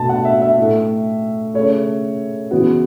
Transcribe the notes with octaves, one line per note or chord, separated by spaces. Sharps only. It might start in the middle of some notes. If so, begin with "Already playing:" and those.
Already playing: B2 A3 A5
F#5
E5
E5
A2 A3
C#3 A3 C#5
C#3 E3 B3 F#4